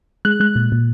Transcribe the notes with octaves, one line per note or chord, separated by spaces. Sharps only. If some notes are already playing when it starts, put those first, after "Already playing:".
G#3 F#6
G#3 F#6
A#2
A#2